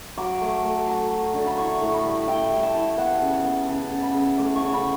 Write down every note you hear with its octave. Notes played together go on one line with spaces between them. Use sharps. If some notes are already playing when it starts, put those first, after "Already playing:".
F#3 D6
A3
A3
F#3
F#3
D3
B5
E4 C#6
A2
B5
G3
E4 G5
G3
A5
E4
B3 F#5
C#3
B3
C#3 A5
C#3
B5
C#3
A3 D6
C#6
C#3
B5